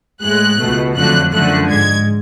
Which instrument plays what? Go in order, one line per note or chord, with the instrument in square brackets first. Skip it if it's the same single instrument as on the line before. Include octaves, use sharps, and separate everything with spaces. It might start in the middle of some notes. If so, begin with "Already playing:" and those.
[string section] A2 G#3 F#6
C#2 B2 A3
F2 D3 F#3 A3 F#6
F#2 D3 F3 A3 F#6
G#2 G#3 G#6